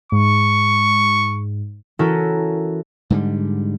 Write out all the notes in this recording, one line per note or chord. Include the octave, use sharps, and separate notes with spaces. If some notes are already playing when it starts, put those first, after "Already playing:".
G#2 C#6
E3 C#4 E4 F#4 A4 A#4
G#2 D3 G3